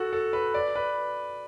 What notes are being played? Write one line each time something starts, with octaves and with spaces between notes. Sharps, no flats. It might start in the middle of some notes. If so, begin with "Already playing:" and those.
Already playing: F#4 A4
A4
B4
D5
B4